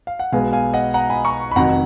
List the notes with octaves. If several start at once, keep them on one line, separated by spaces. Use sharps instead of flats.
F5
F#5
B1 B2 G#3 B3 F5 G#5
F5 G#5
D#5 F#5
F#5 A#5
G#5 B5
A#5 C#6
B5
F1 F2 D#3 F#3 F#5 A#5